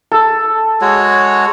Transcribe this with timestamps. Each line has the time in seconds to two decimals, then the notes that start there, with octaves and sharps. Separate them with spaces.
0.12 A4
0.82 G#3 F#4 C#5